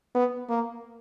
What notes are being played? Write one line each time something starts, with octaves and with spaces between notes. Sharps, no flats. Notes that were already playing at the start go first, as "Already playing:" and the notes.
B3
A#3